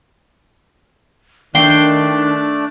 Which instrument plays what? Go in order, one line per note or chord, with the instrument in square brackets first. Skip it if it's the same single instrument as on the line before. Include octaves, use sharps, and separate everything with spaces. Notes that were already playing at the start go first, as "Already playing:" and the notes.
[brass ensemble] D#3 [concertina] A3 D5 [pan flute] D4 [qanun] G5 C6